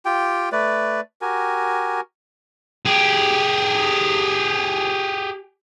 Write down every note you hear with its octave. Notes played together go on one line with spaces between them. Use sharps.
F4 G4 G5
A3 B4 D5
F#4 G4 A#4 G#5
G4 G#4